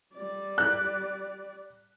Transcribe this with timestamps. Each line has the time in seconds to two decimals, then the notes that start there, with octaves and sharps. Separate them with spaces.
0.14 G3 D5
0.58 F#6